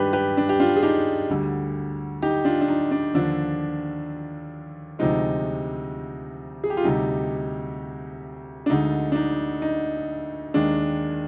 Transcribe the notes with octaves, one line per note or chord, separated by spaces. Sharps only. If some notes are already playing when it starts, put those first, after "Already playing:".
Already playing: G2 D#3 G#3 D4 G4 B4
G4 B4
D4
G4
D4 F4
G#4
D#4 G4
D2 D3 G3
D#4 G4
D4 F4
D4
D#4
D4
D#2 D3 F3 D4
D2 C3 F3 G#3 D#4
G#4
G4
F4
D2 C3 G3 D#4
D4
D2 D3 G#3 D#4
D4
D#4
D#4
D#2 D#3 G#3 D4